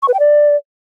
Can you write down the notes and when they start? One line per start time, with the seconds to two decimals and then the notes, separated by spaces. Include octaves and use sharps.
0.02 C#6
0.08 B4
0.14 G5
0.19 D5